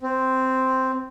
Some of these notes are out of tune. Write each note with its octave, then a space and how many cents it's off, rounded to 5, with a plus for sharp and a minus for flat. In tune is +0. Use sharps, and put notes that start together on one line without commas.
C4 -5